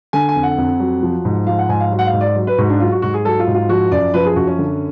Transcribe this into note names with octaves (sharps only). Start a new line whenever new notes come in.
D3 G#5
G#5
F2
F#5
F2
F#3
F3
G#2
F3 F5
F#5
G#2 G#5
F5
F#3
F#5
F5
G#2
D5
F#3
B4
G#2 F#4
D4
F#3 F4
F#4
G#2 F#4
G#4
F#3 A4
F4
G#2
F4
F3 F#4
F#2 D5
F3 B4
G#4
F#2 F#4
C#4
D3